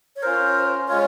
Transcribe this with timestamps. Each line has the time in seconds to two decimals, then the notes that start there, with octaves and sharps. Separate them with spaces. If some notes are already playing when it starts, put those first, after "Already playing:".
0.16 C#5
0.22 C#4 F4 A#4 C5
0.88 G#3 C#4 F4 C#5